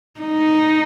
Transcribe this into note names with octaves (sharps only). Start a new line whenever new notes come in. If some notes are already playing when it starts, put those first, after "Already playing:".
D#4